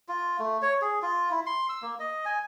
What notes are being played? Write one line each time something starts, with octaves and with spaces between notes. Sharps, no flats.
F4
A3
C#5
G#4
F4
E4
C6
E6
A#3
D#5
G#5